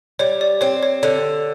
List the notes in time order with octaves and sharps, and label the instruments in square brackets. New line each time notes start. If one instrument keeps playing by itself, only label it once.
[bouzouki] G3 [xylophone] C#5
[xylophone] D5
[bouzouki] C4 [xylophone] C#5
[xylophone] C#5
[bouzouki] D3 [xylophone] C#5